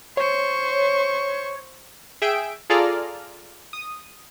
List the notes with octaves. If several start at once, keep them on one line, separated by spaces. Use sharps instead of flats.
C5 C#5 C#6
G#4 E5 G5 D7
F4 G#4 A4 D5 A#5 F6
D#6